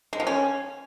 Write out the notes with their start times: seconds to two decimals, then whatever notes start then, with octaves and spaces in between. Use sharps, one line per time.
0.13 G#3
0.20 F3
0.27 C#4